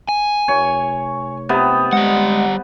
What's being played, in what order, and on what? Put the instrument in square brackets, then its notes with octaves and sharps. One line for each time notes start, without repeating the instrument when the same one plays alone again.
[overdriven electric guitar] G#5
[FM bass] F1 [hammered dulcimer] C#5
[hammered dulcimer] C3 B3
[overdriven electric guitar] G3 F#5 [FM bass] G#3